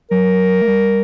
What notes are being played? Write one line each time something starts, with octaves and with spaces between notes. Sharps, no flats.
F#3 A#4
A3
G3